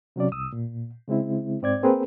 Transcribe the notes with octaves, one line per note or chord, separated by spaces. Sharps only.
C3 F#3 C#4 D5
C2 D#6 E6
A#2
C#3 G#3 C4 E4
G#2 C4 D5 G#6
A#3 C4 G#4 A#4 B4